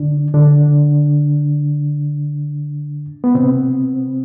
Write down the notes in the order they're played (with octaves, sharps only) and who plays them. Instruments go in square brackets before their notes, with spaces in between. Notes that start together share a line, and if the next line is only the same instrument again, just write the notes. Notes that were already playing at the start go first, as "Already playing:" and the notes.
Already playing: [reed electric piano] D3 D4
D3 D4
B3
C3 C4